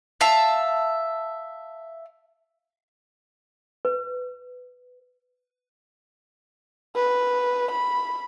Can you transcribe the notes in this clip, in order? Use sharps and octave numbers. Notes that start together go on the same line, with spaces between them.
E5 F5 A5
B4
B4
B5